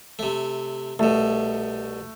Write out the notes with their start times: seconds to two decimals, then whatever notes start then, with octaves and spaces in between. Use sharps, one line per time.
0.19 C3 A3
0.99 C2 B2 A3